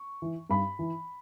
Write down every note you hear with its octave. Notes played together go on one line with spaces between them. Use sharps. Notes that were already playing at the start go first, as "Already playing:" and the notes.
Already playing: C#6
E3
G2 B5
E3